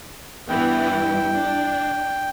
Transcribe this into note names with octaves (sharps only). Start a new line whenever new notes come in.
G2 E3 B3 E4 G5
D4